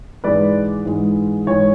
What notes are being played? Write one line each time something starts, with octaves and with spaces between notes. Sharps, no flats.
G#2 E3 G#3 B4 D5
G#2 E3 G#3
G#2 E3 G#3 C#5